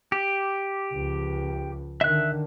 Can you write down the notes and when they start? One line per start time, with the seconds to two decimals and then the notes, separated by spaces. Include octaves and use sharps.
0.12 G4
0.93 C#2 F3
2.01 D3 D#3 E5 F#6